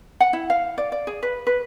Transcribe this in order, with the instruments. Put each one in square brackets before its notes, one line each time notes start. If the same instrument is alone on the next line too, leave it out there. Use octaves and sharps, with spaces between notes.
[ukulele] F#5
E4
F5
D5
D5
G#4
B4
B4